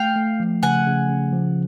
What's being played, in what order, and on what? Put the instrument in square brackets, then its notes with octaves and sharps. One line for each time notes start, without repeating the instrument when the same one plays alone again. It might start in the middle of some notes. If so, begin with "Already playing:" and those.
Already playing: [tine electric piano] A3 [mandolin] F5 G5
[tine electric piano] A3
F3
[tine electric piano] C#3 [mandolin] F#5 G#5
[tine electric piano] C#3
C#3
F3